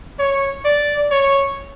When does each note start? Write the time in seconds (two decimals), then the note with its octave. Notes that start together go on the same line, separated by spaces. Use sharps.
0.19 C#5
0.65 D5
1.11 C#5